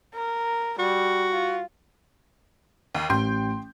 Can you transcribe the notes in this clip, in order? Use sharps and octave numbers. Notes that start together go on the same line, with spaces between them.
A#4
G3 F#4
F4
D#2
A1 G5 C6 G6